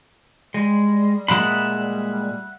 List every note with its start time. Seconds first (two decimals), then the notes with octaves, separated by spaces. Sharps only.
0.54 G3 G#3
1.28 A#2 G#3 E5 F#5 B5